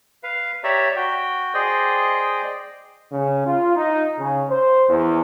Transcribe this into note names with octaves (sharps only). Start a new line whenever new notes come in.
B4 F5
G4 C#5 D5 E5 A#5
F#4 G5
G#4 C5 D5 D#5 G5
C#3
F4
D#4
C#3
C5
E2